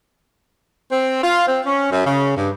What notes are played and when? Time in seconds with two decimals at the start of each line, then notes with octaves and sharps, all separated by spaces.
0.92 C4
1.24 F4
1.48 C4
1.66 C#4
1.92 F#2
2.06 C#3
2.37 G2